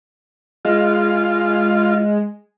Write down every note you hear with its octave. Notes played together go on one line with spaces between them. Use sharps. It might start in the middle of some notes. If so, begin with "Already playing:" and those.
G#3 F4